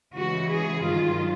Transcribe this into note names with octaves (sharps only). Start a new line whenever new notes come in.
C#3 E3 G#3 F#4
G#4
G2 D#3 F#3 F4